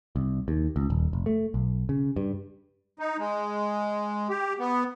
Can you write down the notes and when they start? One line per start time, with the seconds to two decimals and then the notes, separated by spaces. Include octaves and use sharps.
0.16 C2
0.48 D#2
0.76 C#2
0.90 D#1
1.13 F1
1.26 A3
1.54 B1
1.89 C#3
2.16 G2
2.99 D#4
3.19 G#3
4.29 G4
4.59 B3